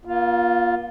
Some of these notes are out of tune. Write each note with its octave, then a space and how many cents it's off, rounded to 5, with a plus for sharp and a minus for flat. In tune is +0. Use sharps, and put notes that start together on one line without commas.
A#3 +40 F4 +0